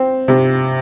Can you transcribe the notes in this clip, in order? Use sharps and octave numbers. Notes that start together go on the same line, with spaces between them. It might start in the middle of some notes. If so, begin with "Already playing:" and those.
Already playing: C4
C3